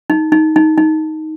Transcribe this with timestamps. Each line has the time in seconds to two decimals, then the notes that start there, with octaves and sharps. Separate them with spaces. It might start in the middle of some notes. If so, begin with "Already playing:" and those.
0.10 D#4
0.32 D#4
0.56 D#4
0.78 D#4